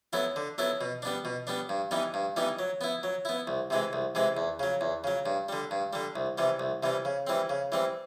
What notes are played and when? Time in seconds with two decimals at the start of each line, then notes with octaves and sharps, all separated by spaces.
0.13 F#3 B3 E4 A4
0.36 D3
0.58 F#3 B3 E4 A4
0.81 B2
1.02 G3 B3 D4
1.25 B2
1.47 G3 B3 D4
1.69 G2
1.91 E3 G3 B3 D#4
2.14 G2
2.36 E3 G3 B3 D#4
2.59 F#3
2.81 B3 E4
3.03 F#3
3.25 B3 E4
3.47 C2
3.70 C3 E3 G#3
3.93 C2
4.15 C3 E3 G#3
4.37 E2
4.60 C#3 F#3
4.81 E2
5.04 C#3 F#3
5.26 G2
5.49 D3 G3
5.71 G2
5.93 D3 G3
6.16 C2
6.38 C3 E3 G3
6.60 C2
6.83 C3 E3 G3
7.05 C#3
7.27 E3 G3 C4
7.49 C#3
7.72 E3 G3 C4